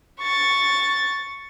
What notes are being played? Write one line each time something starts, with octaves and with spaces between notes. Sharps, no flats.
C#6 A6